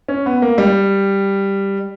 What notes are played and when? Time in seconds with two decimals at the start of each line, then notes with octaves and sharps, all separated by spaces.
0.08 C#4
0.26 B3
0.42 A#3
0.58 G3